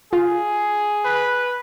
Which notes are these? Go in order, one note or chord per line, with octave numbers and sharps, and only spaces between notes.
F4 G#4
B4